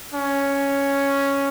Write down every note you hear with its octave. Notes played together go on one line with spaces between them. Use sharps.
C#4